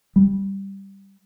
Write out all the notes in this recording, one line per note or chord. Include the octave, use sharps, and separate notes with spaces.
G3